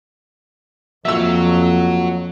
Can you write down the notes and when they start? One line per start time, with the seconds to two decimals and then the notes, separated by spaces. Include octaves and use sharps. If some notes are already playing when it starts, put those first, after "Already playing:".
1.05 F2 F#3 A#3 F4 E5 F5 E6